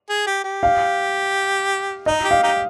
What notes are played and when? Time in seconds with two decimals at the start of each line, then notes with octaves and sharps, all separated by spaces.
0.09 G#4
0.27 G4
0.44 G4
0.63 F5
2.06 D#4 D#5
2.24 G4
2.31 F5
2.43 D#4 G4